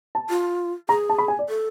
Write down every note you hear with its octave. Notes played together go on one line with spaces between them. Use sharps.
A5
F4
G#4 A#5
A5
B5
G#5
D5
A4